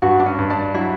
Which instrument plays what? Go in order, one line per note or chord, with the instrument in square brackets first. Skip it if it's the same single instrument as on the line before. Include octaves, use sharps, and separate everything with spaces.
[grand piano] G2 [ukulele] F#4
[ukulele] D4
C#4
[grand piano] G2
[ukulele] D4
[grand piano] F#3 [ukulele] E4